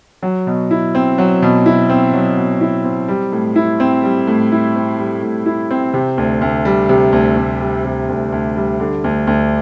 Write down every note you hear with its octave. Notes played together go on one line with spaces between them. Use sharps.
F#3
B2
E4
C4
F#3
B2
E4
C4
F#3
B2
E4
C4
G3
A2
E4
C4
G3
A2
E4
C4
G3
A2
E4
C4
C3
D2
D2
G3
C3
D2
D2
G3
C3
D2
D2
G3
D3
D2
D2